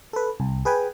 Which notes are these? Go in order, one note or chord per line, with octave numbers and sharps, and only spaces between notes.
A4 B4
C2
G#4 B4 G5 G#5